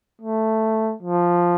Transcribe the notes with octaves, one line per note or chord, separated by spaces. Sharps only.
A3
F3